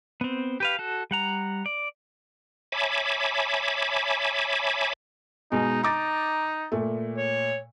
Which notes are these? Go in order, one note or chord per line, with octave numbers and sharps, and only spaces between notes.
B3 C4
G4 B4 F5
F#4 A4
G3 F#5 A#5
D5
C#5 E5 G#5 A5 B5 D6
B2 G#3 D#4
D#4 A#5 D6 A6
A#2 A3
C#5